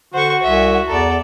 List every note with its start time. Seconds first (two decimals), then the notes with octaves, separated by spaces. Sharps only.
0.14 D3 F#4 C5 F#5 C#6
0.43 C2 E5 G#5
0.88 E2 A4 D5 A#5